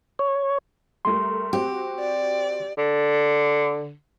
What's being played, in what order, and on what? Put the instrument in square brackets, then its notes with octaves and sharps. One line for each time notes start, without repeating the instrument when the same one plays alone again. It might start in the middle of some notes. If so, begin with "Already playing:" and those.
[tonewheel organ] C#5
[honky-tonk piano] G3 A3 A#4 [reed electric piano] C6
[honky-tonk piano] C4 F#4 [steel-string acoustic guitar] G4
[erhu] D5
[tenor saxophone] D3